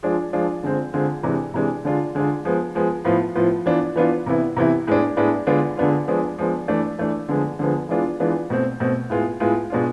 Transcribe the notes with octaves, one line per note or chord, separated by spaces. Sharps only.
F3 G#3 D4 F4
F3 G#3 D4 F4
D3 G#3 C4 F4
D3 G#3 C4 F4
C3 E3 G#3 D4
C3 E3 G#3 D4
D3 G#3 D4 F4
D3 G#3 D4 F4
F3 G#3 B3
F3 G#3 B3
A2 F3 B3 F4
A2 F3 B3 F4
E3 B3 D4 F4
E3 B3 D4 F4
C3 E3 B3 E4
C3 E3 B3 E4
A2 G#3 B3 D4
A2 G#3 B3 D4
D3 G#3 B3 D4 F4
D3 G#3 B3 D4 F4
F3 G#3 B3 D4
F3 G#3 B3 D4
E3 A3 D4
E3 A3 D4
D3 F3 G#3 B3
D3 F3 G#3 B3
E3 G#3 B3 D4 F4
E3 G#3 B3 D4 F4
B2 A3 C4
B2 A3 C4
A2 G#3 B3 F4
A2 G#3 B3 F4
B2 G#3 B3 D4 F4